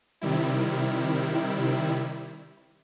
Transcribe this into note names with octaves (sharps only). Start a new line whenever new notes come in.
C3 D#3 G3 E4